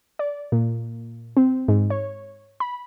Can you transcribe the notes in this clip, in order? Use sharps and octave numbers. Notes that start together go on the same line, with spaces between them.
D5
A#2
C4
G#2
C#5
B5